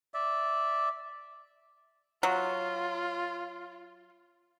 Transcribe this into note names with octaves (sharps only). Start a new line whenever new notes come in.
D5 E5
F#3 F4